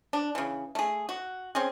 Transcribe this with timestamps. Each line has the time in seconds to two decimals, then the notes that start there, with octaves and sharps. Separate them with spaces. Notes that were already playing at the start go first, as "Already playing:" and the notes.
0.13 D4
0.35 C#3 E3
0.75 A3 G#4
1.09 F#4
1.55 C4 C#4 G#4